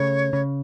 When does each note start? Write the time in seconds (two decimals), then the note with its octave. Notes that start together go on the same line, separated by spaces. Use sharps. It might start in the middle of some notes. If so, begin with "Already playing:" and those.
Already playing: C#3 A3 C#5
0.33 C#3